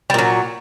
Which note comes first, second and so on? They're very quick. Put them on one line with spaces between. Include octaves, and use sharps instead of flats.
G3 A#2 F#3